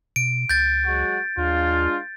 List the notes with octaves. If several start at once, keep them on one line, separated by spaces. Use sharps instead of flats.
B2 D7
C#2 G6 A6
F#3 G#3 F#4
D#2 G#3 D4 F4